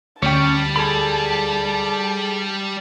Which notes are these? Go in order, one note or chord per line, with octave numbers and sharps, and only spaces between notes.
D2 G3 C#4 C#5 G5 A5
G#4 A4 B5